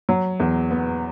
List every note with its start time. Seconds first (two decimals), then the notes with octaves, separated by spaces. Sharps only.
0.09 F#3
0.40 E2
0.71 B3